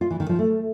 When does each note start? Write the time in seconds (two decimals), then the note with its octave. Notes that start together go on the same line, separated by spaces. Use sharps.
0.01 F4
0.10 E3
0.20 D#3
0.29 F3
0.39 A3